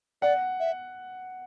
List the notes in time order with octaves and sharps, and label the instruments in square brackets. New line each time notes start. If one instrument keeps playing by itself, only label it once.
[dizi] D5 [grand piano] F#5
[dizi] E5